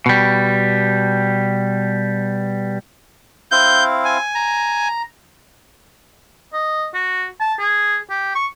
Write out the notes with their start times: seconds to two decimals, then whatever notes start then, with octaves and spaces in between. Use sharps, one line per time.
0.06 B2 G3
3.52 C4 E4 F5 G6
4.05 G#5
4.35 A#5
6.53 D#5
6.94 F#4
7.40 A5
7.59 G#4
8.10 G4
8.35 C#6